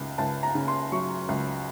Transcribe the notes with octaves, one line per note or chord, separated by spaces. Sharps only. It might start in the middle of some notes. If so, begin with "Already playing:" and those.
Already playing: C#2 C#3
C#2 A5
A#5
C#3
C6
F#3 C#6
C#2